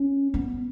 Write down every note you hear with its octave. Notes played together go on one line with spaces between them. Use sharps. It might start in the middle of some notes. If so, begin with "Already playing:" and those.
Already playing: C#4
B3